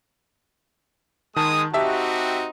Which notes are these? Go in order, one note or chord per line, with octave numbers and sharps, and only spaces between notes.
D#3 G#3 A5 D#6
C4 D#4 F#4 G4 E5 A5